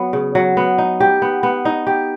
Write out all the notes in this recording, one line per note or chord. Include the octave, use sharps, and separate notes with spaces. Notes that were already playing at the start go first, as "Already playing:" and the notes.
Already playing: F#3 B3
C#3
F#3
B3
D#4
G4
B3
B3
D#4
G4